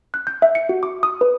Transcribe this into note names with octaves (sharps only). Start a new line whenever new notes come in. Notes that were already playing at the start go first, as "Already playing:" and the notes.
F#6
G6
E5
C#7
F#4
D6
D#6
B4